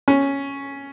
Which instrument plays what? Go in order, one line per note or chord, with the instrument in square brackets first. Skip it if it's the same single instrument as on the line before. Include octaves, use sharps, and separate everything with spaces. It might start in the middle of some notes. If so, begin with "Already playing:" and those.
[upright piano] C#4